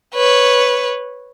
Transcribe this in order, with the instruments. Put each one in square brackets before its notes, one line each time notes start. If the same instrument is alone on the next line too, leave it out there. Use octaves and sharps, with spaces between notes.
[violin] B4 C#5